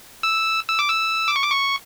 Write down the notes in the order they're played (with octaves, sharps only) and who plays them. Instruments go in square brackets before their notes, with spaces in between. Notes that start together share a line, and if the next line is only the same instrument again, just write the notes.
[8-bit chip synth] E6
E6
D6
E6
D6
C#6
D6
C#6